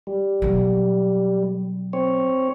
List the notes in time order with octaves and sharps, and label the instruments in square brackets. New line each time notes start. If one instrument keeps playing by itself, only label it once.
[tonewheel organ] G3
[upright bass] B2 F#3
[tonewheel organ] C4 C#5